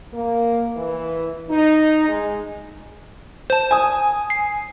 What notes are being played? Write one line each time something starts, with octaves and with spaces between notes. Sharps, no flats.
A#3
E3
D#4
G#3
C5 A5
G#5 D#6
C7